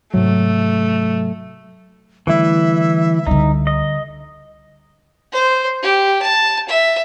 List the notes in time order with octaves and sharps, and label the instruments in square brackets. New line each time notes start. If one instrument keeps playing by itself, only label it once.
[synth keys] G#2 C3 F#3 [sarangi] A3
[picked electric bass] D3 G3 A3 [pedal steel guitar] E3 E4 [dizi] E5
[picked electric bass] C#2 [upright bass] D3 G3 [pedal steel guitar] D#4
[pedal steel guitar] D#5
[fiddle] C5
G4
A5
E5